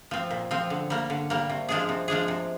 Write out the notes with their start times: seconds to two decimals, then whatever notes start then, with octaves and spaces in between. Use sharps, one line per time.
0.11 F3 C4
0.31 A#2
0.51 F3 C4
0.70 D3
0.90 G3 A#3
1.10 D3
1.30 G3 A#3
1.49 C3
1.69 F3 G#3 D4 G#4
1.89 C3
2.08 F3 G#3 D4 G#4
2.28 C3